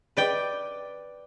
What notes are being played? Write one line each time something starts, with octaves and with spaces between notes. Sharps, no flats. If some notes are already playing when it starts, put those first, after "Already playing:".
B4 D5 G5